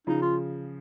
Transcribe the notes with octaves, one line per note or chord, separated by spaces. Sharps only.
C#3 F3 D#4
F4